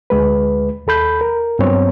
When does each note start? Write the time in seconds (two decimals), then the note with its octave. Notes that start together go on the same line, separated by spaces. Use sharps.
0.10 D2 G#3 B4
0.87 D#2 A4 B5 G6
1.21 A#4
1.59 G2 F#3 B3 C4 C#5